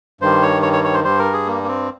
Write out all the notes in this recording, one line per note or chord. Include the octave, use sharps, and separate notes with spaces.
G2 D#3 G3 C5
C#5
C#5
C#5
C#5
C5
G2 G3 C5
A#4
G#4
A#3
A#3
C4